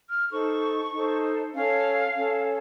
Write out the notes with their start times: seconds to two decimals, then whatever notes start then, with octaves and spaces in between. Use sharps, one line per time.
0.10 F6
0.31 D#4 A4 C5 C#6
0.93 D#4 A4 C5
1.54 C#4 A4 C#5 F5
2.17 C#4 A4 C#5